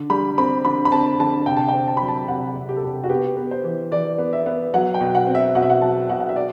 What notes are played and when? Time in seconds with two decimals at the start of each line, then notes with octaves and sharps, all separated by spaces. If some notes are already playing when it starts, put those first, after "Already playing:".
Already playing: D3
0.10 G3 B5
0.38 C4 B5
0.65 D3 B5
0.85 B5
0.92 C4 A5
1.19 D3 A5
1.46 C3 G5
1.57 A5
1.68 C4 G5
1.88 A5
1.97 F#3 B5
2.08 A5
2.28 C3 F#5
2.56 C3
2.69 G4
2.76 A4
2.83 C3 G4
3.04 F#4
3.09 B3 G4
3.37 B3
3.51 C5
3.64 E3
3.91 E3 D5
4.18 B3
4.33 E5
4.46 B3
4.74 F#3 F#5
4.94 G5
5.01 B2
5.15 F#5
5.27 C4
5.35 E5
5.55 B2 F#5
5.62 E5
5.70 F#5
5.82 F#3 A5
6.09 B2 F#5
6.20 F#5
6.29 E5
6.36 D5